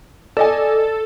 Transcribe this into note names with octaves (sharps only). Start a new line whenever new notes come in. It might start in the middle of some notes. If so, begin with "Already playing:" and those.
A4 D5 D#5 G#5